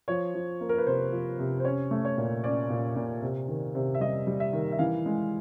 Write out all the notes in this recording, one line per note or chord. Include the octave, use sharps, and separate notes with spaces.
F3 C#5
F3
A#3
A#4
B4
C3 C5
F3
C3
C5
C#4 C#5
A3
C#5
A#2
C#4 D5
A#2
A#2
C3
D#3
C3
E5
G3 D#5
G3
E5
D#3
E5
E3 F5
G#3